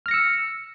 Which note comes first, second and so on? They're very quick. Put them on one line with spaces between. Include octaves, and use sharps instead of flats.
F6 A#6 C#7 E6